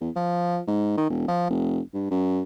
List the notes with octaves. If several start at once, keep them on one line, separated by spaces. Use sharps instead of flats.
E2
F3
G#2
D#3
E1
F3
F1
G2
F#2